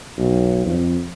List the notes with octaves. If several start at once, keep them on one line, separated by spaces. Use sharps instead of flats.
B1
F2